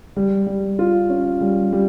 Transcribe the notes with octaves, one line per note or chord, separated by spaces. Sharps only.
G3
G3
F4
C#4
G3
G3